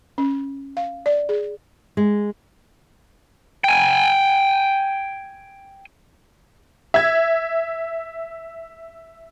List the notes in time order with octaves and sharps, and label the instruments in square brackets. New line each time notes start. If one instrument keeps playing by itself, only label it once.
[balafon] C#4
F5
D5
G#4
[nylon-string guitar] G#3
[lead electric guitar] G5 G#5
[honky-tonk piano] E5 G#6